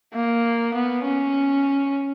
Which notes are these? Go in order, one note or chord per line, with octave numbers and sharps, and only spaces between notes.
A#3
B3
C#4